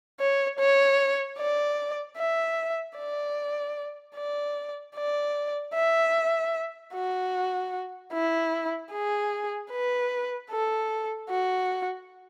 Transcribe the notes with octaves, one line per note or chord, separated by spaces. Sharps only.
C#5
C#5
D5
E5
D5
D5
D5
E5
F#4
E4
G#4
B4
A4
F#4